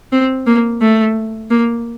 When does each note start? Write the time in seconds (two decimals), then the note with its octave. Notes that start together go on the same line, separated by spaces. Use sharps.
0.12 C4
0.46 A#3
0.81 A3
1.50 A#3